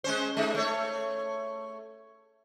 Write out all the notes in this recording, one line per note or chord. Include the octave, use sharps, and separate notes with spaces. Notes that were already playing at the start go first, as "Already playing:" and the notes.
G#3 C#4 C5
G#3 D#4
A3 C#5